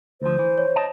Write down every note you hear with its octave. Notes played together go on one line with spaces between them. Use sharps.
D2 F3 C5
E3
C#5
D#5 A5